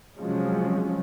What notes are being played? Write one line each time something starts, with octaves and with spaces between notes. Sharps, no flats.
C3 F3 F#3 G#3 C#4